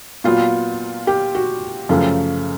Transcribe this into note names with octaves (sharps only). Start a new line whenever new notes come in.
A#2 F#3 B3 F4
G4
F#4
F#2 C#3 F3 A3